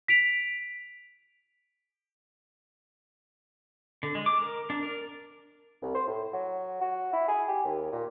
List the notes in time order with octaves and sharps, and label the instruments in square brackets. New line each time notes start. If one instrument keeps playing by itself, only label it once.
[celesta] B6 D7 F7
[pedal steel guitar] D3
G#3
D6
A#4
D4
A#4
[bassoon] C2
C5
A2
F#3
F#4
E4
G#4
G4
D#2
A#2